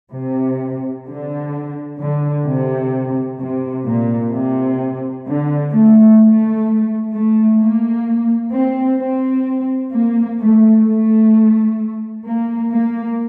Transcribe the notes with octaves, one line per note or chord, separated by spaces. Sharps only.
C3
D3
D3
C3
C3
A#2
C3
D3
A3
A3
A3
A#3
C4
C4
A#3
A3
A3
A#3
A#3